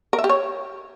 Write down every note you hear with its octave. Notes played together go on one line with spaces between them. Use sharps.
A#4
E5
G4
C#5